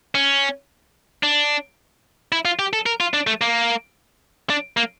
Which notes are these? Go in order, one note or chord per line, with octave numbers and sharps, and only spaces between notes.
C#4
D4
E4
F4
G4
A4
A#4
F4
D4
A3
A#3
D4
A#3